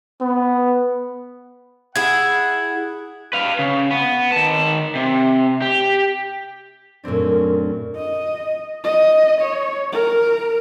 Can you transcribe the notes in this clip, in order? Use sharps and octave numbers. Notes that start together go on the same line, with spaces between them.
B3
E4 G#4 F#5 G#6
B4 F5
C#3
B3
D#3 A5
C3
G4
F#2 A#2 A3 C4 D4
D#5
D#5
C#5
A#4